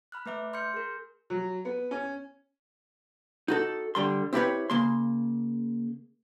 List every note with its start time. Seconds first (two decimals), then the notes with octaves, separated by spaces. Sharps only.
0.12 B5 F6 F#6
0.26 A3 B4 E5 D6
0.53 C6 F6 G6 C#7
0.74 G#4 A#4
1.30 F#3
1.65 B3
1.91 C#4
3.48 D#4 F#4 A4
3.95 D3 G3 C6
4.33 C4 E4 G4 A#4 B4 C#5
4.70 C#3 A#3 C6